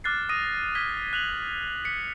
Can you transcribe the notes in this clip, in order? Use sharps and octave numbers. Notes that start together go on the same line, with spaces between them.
D6 F6 F#6 A6 C7
D#6 A#6 D#7
F6 G#6 A#6 B6 G7
F#6 F7 F#7
B6 C#7